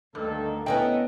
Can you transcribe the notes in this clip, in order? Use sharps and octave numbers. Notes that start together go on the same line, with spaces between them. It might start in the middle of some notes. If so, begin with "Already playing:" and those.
D2 G2 D3 D#3 A#3 A4
B3 C#4 E4 A4 D#5 G5